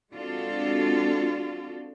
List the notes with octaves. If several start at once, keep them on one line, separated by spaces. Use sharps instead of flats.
G#3 C4 D4 F4 F#4 A4